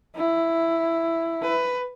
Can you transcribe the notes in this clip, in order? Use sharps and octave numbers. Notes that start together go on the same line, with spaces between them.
E4
B4